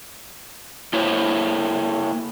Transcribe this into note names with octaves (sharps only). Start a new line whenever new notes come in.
A#3 E4 C5 C#5